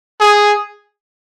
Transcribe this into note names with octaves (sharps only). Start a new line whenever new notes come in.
G#4